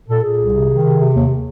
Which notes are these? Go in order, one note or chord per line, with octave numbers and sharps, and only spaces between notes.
A#2 A4
A#2 G#4
C2
C3
D#3
C3
C3
D#2